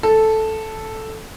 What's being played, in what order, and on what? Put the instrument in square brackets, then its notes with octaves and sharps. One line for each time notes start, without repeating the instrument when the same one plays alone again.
[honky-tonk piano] A4